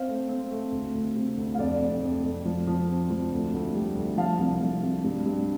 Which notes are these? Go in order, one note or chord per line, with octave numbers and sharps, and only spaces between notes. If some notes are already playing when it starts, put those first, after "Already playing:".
Already playing: C4 C5 F5
A3
C4
A3
D2
D2
C3
D2
F5
F2 D5
F1
F2
F2
F3
F3
C4
F3
D2
D2
G3
D2
F3 F5 A5
C2
C2
C3
G2
G2